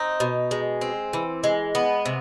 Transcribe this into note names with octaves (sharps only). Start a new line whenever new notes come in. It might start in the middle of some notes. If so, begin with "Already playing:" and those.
Already playing: C4 D#4
B2
G#3
C4
E3
G#3
B3
C3